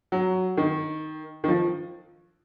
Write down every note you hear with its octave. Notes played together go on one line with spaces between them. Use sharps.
F#3
D#3
D#3
F3